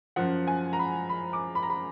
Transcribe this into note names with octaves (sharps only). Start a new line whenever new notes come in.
F#2 F3 F#5
G#5
A#5
B5
B5
D6
B5
A#5
B5